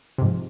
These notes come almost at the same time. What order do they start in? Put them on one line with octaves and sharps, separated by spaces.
C3 G#2 F3